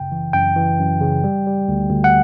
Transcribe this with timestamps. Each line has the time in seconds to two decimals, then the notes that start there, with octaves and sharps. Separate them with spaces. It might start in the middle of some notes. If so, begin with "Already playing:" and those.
Already playing: G1 F#2 C#3 G5
0.12 E3
0.33 F#2 G5
0.56 E3
0.79 F#2
1.01 C#3
1.24 G3
1.47 G3
1.69 D2
1.91 D2
2.04 F#5